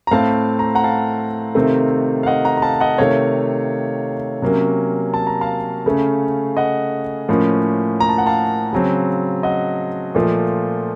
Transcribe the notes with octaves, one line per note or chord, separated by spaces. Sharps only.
A#5
A2 A3 C4 F5 A5
A#5
F#5 A#5
F5 A5
C3 D#3 A3 C4
F5
D#5 F#5
F#5 A#5
A#5
F5 A5
D#5 F#5
C3 D#3 A3 C#5 F5
C3 F#3 A#3 C#4
A5
A#5
F5 A5
C#3 A3 C#4
D#5 F#5
A2 F3 A#3 C#4
A#5
A5
F#5
F5 A5
C#3 F#3 C4
D#5 F#5
A#2 F3 A3